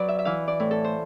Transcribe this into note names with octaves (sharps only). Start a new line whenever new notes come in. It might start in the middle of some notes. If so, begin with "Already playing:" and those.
Already playing: F#3 B4 D5
E5
E5
E3 F5
D5
A2
A4
C5